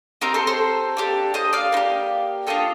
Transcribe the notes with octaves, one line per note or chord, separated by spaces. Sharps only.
C4 D#4 G4 A#4
A4 C5
A4 C5
A#3 D4 G4
C5 D#5
D5 F5
A#3 D#4 G4
D4 F4 A4 D#5 G5